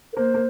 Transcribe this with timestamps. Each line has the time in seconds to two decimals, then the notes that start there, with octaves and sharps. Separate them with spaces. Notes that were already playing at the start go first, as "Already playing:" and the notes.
0.13 A#4
0.16 A#3 C5
0.34 A#3